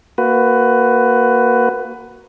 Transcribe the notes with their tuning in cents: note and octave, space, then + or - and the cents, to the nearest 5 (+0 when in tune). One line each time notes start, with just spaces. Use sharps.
A#3 +0 F#4 +0 B4 +15